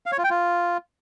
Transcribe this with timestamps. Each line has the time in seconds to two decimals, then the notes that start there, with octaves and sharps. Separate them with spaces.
0.06 F5
0.12 C#5
0.18 F4
0.24 G5
0.30 F4